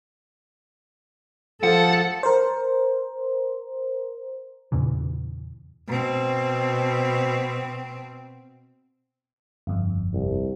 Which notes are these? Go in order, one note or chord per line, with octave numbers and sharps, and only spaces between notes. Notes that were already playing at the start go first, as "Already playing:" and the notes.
F3 A4 F5 F#5
A#4 C5
E2 A#2 C#3 E3
B2 C4
G1 F2
C2